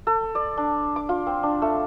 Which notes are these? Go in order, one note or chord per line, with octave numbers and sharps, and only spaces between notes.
A4
D5
D4
D6
F4
C4
D4
A3